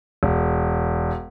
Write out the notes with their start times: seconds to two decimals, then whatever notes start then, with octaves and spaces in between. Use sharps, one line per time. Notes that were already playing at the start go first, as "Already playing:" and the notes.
0.23 E1